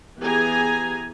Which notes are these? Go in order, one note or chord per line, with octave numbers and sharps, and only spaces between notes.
E3 B3 G4 G#4 G#5 A#5